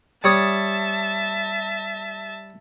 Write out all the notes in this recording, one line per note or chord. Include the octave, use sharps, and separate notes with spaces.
G3 C#5 E5 A5 D#6